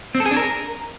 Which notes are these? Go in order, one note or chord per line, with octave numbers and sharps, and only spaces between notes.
C4
A4
G#4
D4
A#4